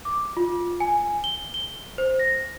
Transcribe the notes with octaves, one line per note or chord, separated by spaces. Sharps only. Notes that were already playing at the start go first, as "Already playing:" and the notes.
D6
F4
G#5
G7
G7
C5
A#6